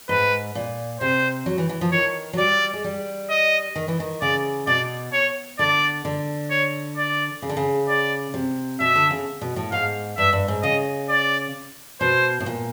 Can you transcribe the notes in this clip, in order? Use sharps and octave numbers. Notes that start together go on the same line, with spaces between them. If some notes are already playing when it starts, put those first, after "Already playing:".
G#2 B4
A#2
C3 C5
F#3
E3
E3
F3
D#3 C#5
F#3
G3 D5
G#3
G3
D#5
D#3
E3
D#3
C#3 D5
B2 D5
C#5
D3 D5
D3
C#5
D5
C#3
D3
C#3
D5
C3
B2 E5
D3
C#3
B2
A2
G#2 F5
G2 E5
G2
G#2
C#3 D#5
D5
B2 C5
A2
A#2